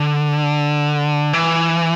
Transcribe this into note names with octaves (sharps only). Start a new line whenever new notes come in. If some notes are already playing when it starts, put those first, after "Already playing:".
Already playing: D3
E3